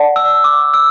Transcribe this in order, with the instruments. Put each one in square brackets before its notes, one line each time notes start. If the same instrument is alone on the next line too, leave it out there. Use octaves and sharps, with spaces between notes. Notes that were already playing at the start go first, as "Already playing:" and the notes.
Already playing: [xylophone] D5 F#5 A5
[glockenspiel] E6
D6
E6